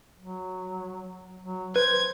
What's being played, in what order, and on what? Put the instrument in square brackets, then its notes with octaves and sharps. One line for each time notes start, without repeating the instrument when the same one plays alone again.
[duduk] F#3
F#3
[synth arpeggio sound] B4 [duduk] C5 [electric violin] G#6